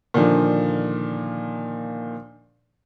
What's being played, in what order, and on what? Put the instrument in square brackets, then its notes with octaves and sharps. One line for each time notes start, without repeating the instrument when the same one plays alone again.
[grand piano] A#2 D3 D#3 F3